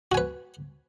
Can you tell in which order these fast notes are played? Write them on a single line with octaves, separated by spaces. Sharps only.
F#4 G#5 B4